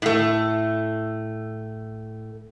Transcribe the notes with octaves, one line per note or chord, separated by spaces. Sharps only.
A2 A3